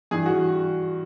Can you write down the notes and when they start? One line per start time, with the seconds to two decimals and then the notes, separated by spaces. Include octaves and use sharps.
0.11 G2 E3 G#4
0.26 F#4